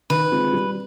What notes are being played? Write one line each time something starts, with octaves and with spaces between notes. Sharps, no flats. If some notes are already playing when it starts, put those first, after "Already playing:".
D#3 B4
G#3 C4 F4 G#4
G3